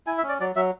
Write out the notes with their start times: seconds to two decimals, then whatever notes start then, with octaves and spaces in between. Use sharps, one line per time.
0.07 E4 G#5
0.18 E5
0.23 C#4
0.29 D5
0.40 F#3 D5
0.56 F#3 E5